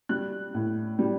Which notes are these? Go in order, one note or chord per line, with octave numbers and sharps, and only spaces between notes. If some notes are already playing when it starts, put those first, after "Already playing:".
G3 F#6
A2
G3